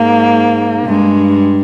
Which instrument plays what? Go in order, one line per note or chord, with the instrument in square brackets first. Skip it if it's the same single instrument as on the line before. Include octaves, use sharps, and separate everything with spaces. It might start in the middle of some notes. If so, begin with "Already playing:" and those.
Already playing: [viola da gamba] G#2 [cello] A#3
[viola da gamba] G2 [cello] G#3